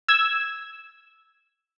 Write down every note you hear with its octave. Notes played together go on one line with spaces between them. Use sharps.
E6 G#6